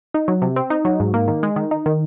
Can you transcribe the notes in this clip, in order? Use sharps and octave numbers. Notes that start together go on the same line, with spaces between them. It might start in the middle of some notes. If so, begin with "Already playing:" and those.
D#4
F#3
C3
C4
D#4
F#3
G#2
A#3
D#3
G#3
D#3
D#4
D#3